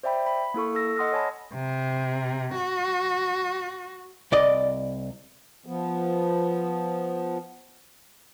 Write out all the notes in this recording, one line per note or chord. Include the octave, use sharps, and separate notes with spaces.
C5 D5 E5 G5 B5
B5
A#3 E4 A4 C#6
A4 E6 A#6
D#5 F#5 C6 D#6 F6 A#6
C#5 G#5 A5 B5
C3
F#4
C2 D5 D#5
F3 B3